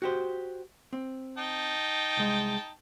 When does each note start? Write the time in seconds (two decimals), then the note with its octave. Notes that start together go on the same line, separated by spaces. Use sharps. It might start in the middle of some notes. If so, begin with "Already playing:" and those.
0.02 F#4 G4 C5
0.93 C4
1.38 D#4 G5 A5
2.17 C2 G#3